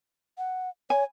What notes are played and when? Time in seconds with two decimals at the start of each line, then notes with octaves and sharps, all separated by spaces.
0.38 F#5
0.90 C#5 G#5